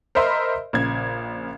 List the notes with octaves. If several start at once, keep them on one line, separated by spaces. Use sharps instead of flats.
A#4 C5 D#5 E5 B5 C6
A#1 C#3 G#6